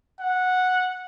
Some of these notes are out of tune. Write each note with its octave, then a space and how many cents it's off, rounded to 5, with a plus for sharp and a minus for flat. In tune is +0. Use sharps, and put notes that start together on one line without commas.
F#5 -10